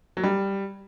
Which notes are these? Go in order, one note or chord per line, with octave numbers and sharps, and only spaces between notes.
F#3
G3